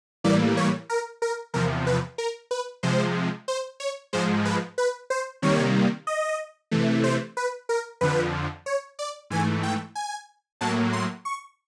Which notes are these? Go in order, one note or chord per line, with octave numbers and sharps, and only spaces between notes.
A2 E3 G3 A#3 D5
C#5
A#4
A#4
E2 C3 F3 A#4
B4
A#4
B4
C3 F3 G#3 C5
C5
C#5
G#2 F3 G#3 C5
B4
B4
C5
C3 D#3 G3 A#3 C#5
D#5
C3 E3 A3
C5
B4
A#4
F2 D3 F3 B4
C#5
D5
G#2 E3 A3 G#5
G5
G#5
A2 F#3 A#3 A5
C6
C#6